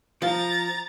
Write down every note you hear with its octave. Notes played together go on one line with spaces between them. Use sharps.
F3 A#5 A6